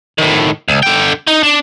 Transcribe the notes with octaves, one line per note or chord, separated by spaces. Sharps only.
A2 D#3
C#2
D3 G5
D#4
D4